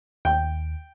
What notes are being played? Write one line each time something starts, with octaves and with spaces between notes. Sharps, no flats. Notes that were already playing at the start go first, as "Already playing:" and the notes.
D#2 G5